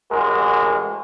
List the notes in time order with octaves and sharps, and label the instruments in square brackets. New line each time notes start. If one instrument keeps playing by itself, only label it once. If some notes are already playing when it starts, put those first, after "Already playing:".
[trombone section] A1 G#3 F#4 A#4 C5